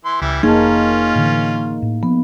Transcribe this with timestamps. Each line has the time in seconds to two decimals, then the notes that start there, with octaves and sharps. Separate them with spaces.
0.05 E3 C6
0.21 C#2 E3 G3 E5
0.43 F1 A#3 C#4 D#4 F4 G#4 A5
1.15 A2 D3 E3
1.82 A2
2.03 F3 B3